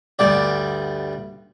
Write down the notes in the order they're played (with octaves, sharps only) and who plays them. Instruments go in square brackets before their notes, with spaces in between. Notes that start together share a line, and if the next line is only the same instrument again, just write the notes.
[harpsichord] D2 G2 B3 D5